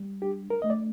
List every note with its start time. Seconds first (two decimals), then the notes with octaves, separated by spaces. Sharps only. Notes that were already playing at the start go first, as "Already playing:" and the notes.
Already playing: G3
0.22 D4 G4
0.50 A#4
0.62 A3 D#5
0.70 D5